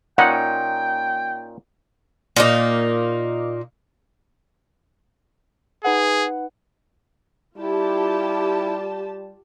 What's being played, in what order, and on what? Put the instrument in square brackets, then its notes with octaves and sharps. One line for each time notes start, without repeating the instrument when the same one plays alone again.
[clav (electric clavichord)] A#2 C#4 D#4 [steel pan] F#5 [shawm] G5
[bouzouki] A#2 A#3 D#4
[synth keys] D#4 B4 F#5 [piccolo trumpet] G#4
[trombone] G3 [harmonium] E4 [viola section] F4 G4 A5